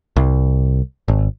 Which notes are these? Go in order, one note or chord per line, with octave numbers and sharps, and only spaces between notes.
C2
G#1